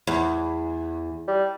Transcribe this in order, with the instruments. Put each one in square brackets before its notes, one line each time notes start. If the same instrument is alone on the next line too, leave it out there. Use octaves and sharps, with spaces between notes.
[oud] E2
[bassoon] G3